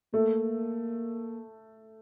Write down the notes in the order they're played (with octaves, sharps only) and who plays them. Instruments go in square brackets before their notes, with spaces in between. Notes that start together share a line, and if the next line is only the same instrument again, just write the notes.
[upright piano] A3 [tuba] A#3